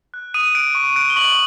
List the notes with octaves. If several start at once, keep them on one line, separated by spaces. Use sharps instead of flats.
F#6
D#6 D#7
F#6 D7
C#6 D7
F#6 D7
G7
C#6 F#7